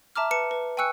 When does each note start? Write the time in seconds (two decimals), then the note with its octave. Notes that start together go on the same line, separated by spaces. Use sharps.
0.16 E5 A5 A#5 D6 F6
0.31 B4 A5 C#7
0.51 B4
0.77 G5 G#5 C#6 E6 F#6 C#7